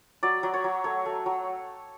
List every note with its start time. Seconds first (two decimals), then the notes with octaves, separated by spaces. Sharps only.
0.23 F#3 D5
0.43 F#3
0.54 C#5
0.64 F#3
0.84 A3 C#5
1.06 A3
1.26 F#3